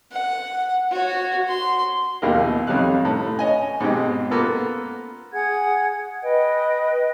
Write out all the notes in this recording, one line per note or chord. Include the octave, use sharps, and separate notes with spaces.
F#5
F#4 C#5
C6
A#1 D#2 B2 E4 G4 A#4
F2 D#3 G3 C#4 F5 F#6
A2
C#5 D#5 G#5
G#2 B2 C4 G4
A#3 B3 F4 A4
G#4 F#5 G#6
B4 D#5 G5